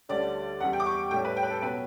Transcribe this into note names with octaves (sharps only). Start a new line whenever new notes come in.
D2 D3 G3 C#4 D5
E2 C#3 G3 F#5
G5
D6
C#6
A2 G3 C#4 G5
B4
G5
B4
A4
B2 F#3 C#4 B4